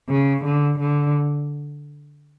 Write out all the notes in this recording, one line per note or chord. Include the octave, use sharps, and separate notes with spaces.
C#3
D3
D3